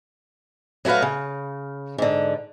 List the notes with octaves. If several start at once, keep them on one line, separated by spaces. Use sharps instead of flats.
F#3 A3 F#4 B4 F5
C#3
G#2 D3